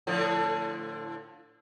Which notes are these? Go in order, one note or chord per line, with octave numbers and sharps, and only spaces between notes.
A2 D3 F3